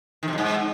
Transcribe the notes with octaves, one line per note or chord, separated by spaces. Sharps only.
D#3
C3
F2
G#2